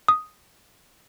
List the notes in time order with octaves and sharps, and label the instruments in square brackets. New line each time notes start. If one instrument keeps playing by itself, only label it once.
[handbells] D#6